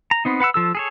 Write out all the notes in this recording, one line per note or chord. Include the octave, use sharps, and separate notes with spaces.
A#5
B3 C4 D#4
B4 F#5 B5 E6
F3 A4 E6
G#4 A4 C#5